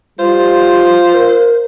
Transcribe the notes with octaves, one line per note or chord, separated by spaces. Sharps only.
G3 F4 C5
A#4